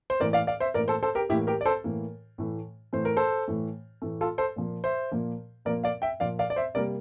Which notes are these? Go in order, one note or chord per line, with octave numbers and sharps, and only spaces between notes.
C5
A2 E3 A#3 A#4 D5
D5 F5
D5 F5
C5 E5
A2 E3 A#3 A#4 D5
A4 C5
A4 C5
G4 A#4
A2 E3 A#3 E4 G4
G4 A#4
D5
A4 C5
A2 E3 A#3
A2 E3 A3
A2 E3 A3 C5
A#4
A4 C5
A2 E3 A3
A2 E3 A3
F4 A4
A4 C5
A#2 F3 A#3
C5 E5
A#2 F3 A#3
A#2 F3 A#3 A#4 D5
D5 F5
E5 G5
A#2 F3 A#3 D5 F5
D5 F5
D5
C5 E5
C3 G3 A#3 A#4 D5